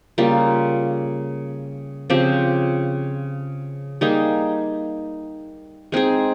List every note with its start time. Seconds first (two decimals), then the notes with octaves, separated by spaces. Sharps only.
0.18 C#3 G3 A#3 F4
2.10 C#3 F3 C4 G4
4.01 G3 A#3 D#4 G#4
5.92 G#3 C4 D#4 G#4